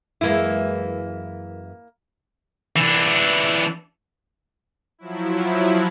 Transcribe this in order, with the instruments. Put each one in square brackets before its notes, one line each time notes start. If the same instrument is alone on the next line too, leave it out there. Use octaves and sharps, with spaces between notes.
[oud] F#2 E3 G#3 [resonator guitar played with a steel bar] A#3 E4
[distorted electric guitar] E3 D4
[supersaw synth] F3 F#3 E4